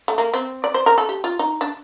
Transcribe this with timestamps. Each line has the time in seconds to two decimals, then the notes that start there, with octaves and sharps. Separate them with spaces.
0.08 A3
0.18 A#3
0.34 C4
0.64 D5
0.74 C5
0.86 A#4
0.98 A4
1.09 G4
1.24 F4
1.39 D#4
1.61 D4